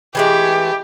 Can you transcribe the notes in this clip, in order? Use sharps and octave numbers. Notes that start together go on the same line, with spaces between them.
E3 G#3 A3 G4